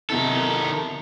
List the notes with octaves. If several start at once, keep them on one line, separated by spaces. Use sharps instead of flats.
C3 D#3 B3 E4 A4